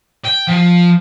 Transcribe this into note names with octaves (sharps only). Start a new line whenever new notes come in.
G5
F3